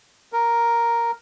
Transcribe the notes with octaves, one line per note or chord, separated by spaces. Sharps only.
A#4